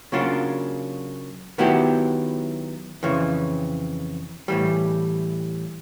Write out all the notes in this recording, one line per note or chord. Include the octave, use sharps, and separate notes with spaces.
C#3 F#3 A#3 D4 F4
D#3 F#3 B3 E4 G4
F2 C#3 E3
A2 E3 G3